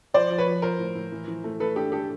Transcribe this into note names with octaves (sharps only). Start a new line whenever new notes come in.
F3 C5 D5
F3
B4 C#5
F3
F3 A#4 C5
A2
A2
E3
E3
A3
A3 A4 B4
D4 G4 A4
A2 G4 A4